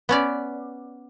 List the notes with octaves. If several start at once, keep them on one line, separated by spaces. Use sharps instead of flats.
B3 C#4 D5